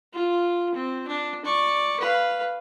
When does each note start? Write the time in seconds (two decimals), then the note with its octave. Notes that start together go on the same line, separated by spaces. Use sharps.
0.13 F4
0.75 C4
1.07 D4
1.45 D5 C#6
2.00 B4 F5